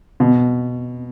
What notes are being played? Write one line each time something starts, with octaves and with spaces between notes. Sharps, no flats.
B2